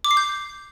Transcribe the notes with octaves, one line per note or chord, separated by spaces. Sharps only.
D6
C7
G6